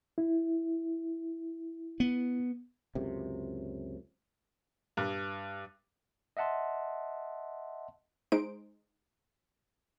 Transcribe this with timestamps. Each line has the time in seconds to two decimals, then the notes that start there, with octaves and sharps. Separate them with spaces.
0.18 E4
2.00 B3
2.95 C#2 F#2 C3
4.97 G2
6.37 D#5 E5 F#5 A5 C6
8.32 G#3 D#4 C5 D7